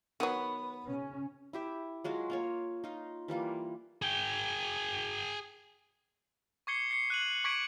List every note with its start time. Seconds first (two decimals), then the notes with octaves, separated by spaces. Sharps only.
0.20 D#3 F#3 B3 B4
0.87 C#3 C#4
1.53 E4 G4 E5
2.04 F#3 G#3 F4 F#4
2.30 A#3 F4 C#5
2.84 D#4 F4
3.28 E3 G3 A#3 F4
4.02 G#4 G5
6.67 C#6 D6 G#6 C7 C#7 G7
6.91 C7 C#7
7.10 F#6 D#7 F#7
7.44 C#6 D6 G#6 B6 D7